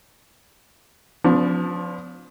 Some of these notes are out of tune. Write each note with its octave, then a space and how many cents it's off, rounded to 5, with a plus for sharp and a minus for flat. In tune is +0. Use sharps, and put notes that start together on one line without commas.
F3 +25 B3 +40 D4 -30